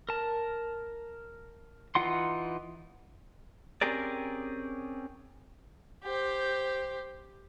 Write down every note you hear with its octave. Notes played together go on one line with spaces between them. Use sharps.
A#4 A5
E3 D#4 F4 F#5 C6
C4 C#4 G4 G#4 A#4 D5
G4 C5